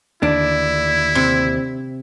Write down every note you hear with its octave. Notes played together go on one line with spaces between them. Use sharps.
D#2 D3 D4 E4
C3